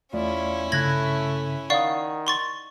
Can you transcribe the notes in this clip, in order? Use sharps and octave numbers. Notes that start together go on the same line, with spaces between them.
E2 A3 C#4 E4 F4 D5
G2 C#3 A3 B5 F#6 G#6 A#6
D#3 D5 F5 F#5 C#6 D#6
C6 C#6 A6